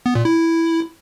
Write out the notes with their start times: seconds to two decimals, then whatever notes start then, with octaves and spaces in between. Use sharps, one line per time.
0.06 B3
0.15 A#2
0.25 E4